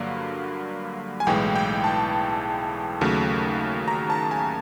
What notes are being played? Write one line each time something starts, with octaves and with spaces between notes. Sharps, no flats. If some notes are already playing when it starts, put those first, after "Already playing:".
Already playing: G2 D3 F#3 A#3 F5
G#5
B1 A2 E3 G#3 G5
G5
A5
D#2 C#3 F#3 A3
A#5
A5
G#5